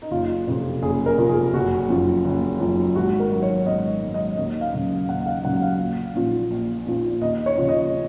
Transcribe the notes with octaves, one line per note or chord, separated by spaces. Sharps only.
D#4
F#1 F4
F2 C3 F3
F#1 G#4
A#4
F2 C3 F3
G#4
F#1 F#4
F#2 F3
F#1
F#2 F3
G#1 F#4
A#4
G#2 F#3
C#5
G#1 D#5
G#2 F#3
D#5
D#2 D#5
F5
C#3 F#3
D#2 F#5
F5
C#3 F#3 F#5
F5
A#1
A#2 F3
A#1
A#2 F3
D#2 D#5
C#5
C#3 F3
D#5